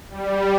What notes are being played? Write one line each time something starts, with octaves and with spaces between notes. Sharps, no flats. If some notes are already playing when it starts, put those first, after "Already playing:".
G3